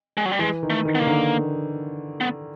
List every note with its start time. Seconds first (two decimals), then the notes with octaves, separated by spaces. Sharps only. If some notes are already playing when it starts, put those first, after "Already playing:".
0.17 G#3
0.25 F#3
0.32 G3
0.39 E3 G#3
0.63 D#3
0.70 A3
0.85 D#3
0.95 B3
1.00 D#3 A#3
1.07 D3
2.21 B3